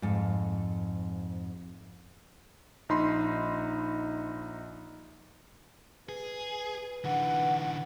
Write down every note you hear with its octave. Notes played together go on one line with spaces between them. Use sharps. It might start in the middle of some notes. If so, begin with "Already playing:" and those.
F2 G#2
A#1 D#4 B5 C6
G#4 B4
D3 E3 F#5